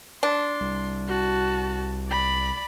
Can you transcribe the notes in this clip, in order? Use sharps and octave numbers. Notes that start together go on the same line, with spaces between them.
D4 C6
C2
F#4 A5
D5 B5